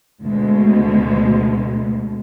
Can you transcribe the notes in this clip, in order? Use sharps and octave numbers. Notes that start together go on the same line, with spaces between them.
D2 B2 G#3